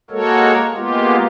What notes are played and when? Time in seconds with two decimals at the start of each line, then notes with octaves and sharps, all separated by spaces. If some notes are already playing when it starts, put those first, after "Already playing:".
0.10 G#3 A#3 F#4 A4 A#4 C#5
0.75 G#3 A#3 B3 F4 G4